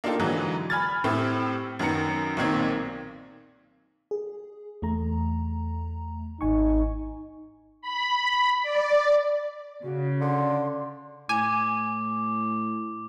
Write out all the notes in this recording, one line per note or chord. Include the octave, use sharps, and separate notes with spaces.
A#3 D4 D#4 F4 G4 A4
G#2 D3 E3 F#3
G#5 B5 F6 G#6 A6
A2 A3 C4 E4 G4
F#2 D#3 B3 A#4 A#5 C#7
B1 A#2 D#3 C4 G#6
G#4
E2 A3 A#5
G#1 D#4 G#5 C#6
B5
D5
C#3 F#4
D3 C6
A2 G#5 D6